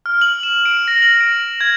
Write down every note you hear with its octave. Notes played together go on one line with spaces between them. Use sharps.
F6
F#7
E7
D7
A#6
F#7
D7
G#6